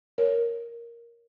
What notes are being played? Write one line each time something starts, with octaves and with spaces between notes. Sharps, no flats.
A#4 C#5